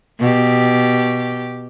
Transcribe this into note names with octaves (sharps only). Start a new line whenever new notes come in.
B2 G4